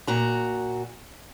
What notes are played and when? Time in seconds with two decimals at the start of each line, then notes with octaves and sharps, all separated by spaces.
0.07 A#2 F#4 A#5